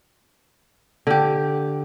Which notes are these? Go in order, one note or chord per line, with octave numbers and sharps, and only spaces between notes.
D3 G4